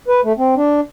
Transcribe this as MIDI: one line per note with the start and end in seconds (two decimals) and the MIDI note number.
0.08 0.21 71
0.24 0.33 57
0.38 0.54 60
0.56 0.81 62